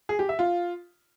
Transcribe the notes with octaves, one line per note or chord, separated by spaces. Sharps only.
G#4
G4
E5
F4